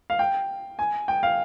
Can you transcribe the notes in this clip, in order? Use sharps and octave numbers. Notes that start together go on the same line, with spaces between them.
F5
G5
G#5
G5
F5